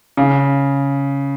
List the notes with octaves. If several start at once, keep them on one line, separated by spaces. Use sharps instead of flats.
C#3